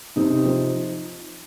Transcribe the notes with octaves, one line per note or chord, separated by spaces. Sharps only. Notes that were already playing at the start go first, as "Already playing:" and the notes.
C3 D#4
F3